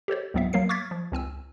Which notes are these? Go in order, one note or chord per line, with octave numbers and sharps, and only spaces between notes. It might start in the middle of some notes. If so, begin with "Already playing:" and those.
G4 A4 C5 C#5
C#2 G#2 F#3 B3 C4 E5
F#3 A#3 A#4 C7
C#6 D6 F6 G#6 A6 B6
F3
C#2 C4 G#5 E6